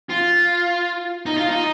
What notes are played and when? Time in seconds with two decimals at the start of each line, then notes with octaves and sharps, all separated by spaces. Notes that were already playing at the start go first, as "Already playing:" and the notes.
0.09 F4
1.26 D#4
1.37 F4
1.51 D#4